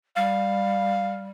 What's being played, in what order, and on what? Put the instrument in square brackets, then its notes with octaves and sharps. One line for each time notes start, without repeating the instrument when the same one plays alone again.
[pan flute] G3 [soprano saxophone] F5